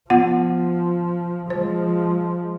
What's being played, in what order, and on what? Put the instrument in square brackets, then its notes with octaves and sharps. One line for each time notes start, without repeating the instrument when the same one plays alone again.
[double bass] F3 [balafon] B3 F4 F#5
[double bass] F3 G#3 [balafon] C5